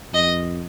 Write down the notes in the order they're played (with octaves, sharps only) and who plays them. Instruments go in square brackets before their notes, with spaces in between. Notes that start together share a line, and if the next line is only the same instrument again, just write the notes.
[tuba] F2 [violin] D#5